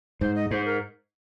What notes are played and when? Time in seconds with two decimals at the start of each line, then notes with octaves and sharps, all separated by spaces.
0.21 G#2 C5
0.36 D#5
0.51 G#2 C5
0.66 A#4